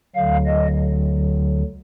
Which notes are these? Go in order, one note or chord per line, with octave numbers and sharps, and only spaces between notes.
D2 D3 F#3 F5
D#5